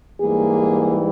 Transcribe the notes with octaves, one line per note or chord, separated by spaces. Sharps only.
G#2 E3 G3 A#3 G#4